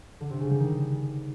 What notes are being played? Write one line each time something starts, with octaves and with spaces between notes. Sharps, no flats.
D3
C3
C#3
G3
D#3